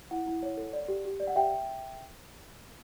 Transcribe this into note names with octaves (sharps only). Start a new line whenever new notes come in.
E4 F#5
E4
C#5
A4
D5
G4
G4
D5
F#5
G4 E5 G5